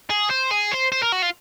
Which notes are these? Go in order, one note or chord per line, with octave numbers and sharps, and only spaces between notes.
G#4
C5
G#4
C5
C5
A#4
F#4
F4